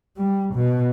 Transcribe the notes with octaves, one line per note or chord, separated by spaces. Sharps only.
G3
B2